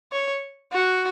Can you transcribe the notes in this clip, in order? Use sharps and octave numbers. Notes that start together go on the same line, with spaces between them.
C#5
F#4